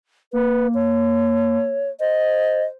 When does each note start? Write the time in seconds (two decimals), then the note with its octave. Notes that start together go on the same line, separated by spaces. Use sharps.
0.33 A#3 B4
0.75 C#5
2.00 C5 D#5